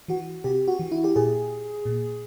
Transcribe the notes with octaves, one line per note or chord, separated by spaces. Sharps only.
E3 F#4
C3 G4
F#4
E3
E4
G4
A#2 G#4
A#2